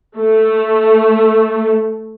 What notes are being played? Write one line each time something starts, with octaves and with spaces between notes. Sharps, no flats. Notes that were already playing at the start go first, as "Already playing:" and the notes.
A3